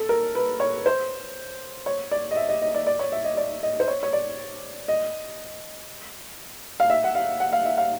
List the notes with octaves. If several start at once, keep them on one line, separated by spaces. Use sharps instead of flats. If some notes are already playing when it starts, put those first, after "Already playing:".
Already playing: A4
A#4
B4
C#5
C5
C#5
D5
D#5
E5
D#5
D#5
D5
D5
C#5
E5
D#5
D5
D#5
C5
C#5
C#5
D5
D#5
F5
E5
F#5
F5
F#5
F5
E5
F5